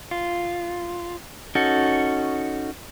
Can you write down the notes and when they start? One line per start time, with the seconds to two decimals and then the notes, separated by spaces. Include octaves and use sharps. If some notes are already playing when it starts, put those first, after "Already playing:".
0.11 F4
1.55 C#4 D#4 F#4 A4